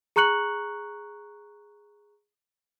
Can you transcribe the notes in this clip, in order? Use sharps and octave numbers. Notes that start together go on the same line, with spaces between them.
G#4 A#5 C#6 F#6 C#7 F#7